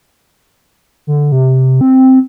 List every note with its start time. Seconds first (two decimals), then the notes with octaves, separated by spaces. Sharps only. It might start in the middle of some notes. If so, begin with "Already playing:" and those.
1.07 D3
1.32 C3
1.81 C4